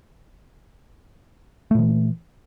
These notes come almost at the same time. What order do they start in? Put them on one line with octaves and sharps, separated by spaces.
A3 A#2 D#3 E3